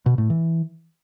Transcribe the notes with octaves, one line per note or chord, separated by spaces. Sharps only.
B2
A2
E3